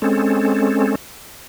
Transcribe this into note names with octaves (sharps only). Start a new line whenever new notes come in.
G#3 C4 C#4 A4